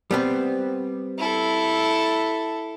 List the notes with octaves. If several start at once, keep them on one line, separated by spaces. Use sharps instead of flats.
G3 B3 C4
E4 A4